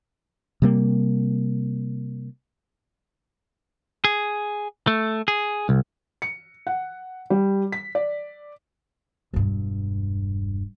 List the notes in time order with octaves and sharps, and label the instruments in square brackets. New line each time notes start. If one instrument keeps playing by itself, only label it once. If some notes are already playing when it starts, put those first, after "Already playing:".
[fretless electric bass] C3 G3 A#3
[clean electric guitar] G#4
A3
G#4
C2
[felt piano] C#7
F#5
G3
B6
D5
[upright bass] E1 G2